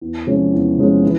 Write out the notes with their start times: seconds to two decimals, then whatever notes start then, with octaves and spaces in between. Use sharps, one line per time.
0.01 E2
0.27 C3 F3 G#3 C#4
0.53 E2
0.78 C3 F3 G#3 C#4
1.03 E3